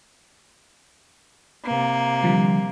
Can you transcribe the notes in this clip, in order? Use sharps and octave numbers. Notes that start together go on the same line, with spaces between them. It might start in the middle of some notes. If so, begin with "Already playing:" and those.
C3 A#3
D3 F3 G3